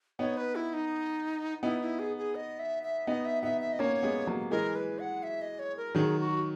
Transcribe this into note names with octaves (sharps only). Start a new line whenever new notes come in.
B3 D#4 C#5
B4
E4
D#4
B3 D#4 E4
E4
G#4
G#4
D#5
E5
E5
B3 D#4 D#5
E5
B3 D#4 E5
E5
D#5
A#3 C#4 C#5
G#3 B3
F#3 A#3
E3 G#3 A#4
B4
F#5
E5
D#5
C#5
A#4
D#3 F#3 G#4
F#4